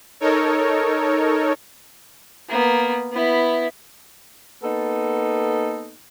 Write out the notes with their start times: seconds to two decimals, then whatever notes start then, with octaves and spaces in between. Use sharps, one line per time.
0.20 D#4 A4 A#4 C#5
2.48 A#3 B3
3.12 B3 E4
4.63 A#3 B3 D#4 A4